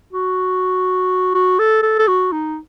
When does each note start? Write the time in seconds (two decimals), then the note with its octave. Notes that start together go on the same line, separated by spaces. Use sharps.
0.13 F#4
1.35 F#4
1.59 A4
1.83 A4
1.99 A4
2.08 F#4
2.32 D#4